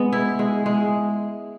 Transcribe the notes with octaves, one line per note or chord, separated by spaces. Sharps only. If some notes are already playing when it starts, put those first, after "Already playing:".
Already playing: G#3 B3
E4
G#3
G#3